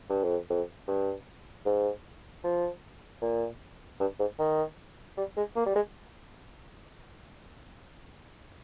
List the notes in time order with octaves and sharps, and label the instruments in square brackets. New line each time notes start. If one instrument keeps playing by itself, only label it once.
[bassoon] G2
F2
F2
G2
G#2
F3
A#2
G2
G#2
D#3
G3
G#3
A#3
G3
G#3